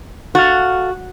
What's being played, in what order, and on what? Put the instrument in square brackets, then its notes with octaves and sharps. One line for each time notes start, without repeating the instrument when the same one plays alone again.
[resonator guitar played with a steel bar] F#4 [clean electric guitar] A4 F5